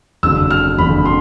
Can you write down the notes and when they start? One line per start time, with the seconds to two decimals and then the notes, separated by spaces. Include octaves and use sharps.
0.23 F#1 F2 D3 E6
0.51 F6
0.78 F#1 F2 D3 B5
1.05 C6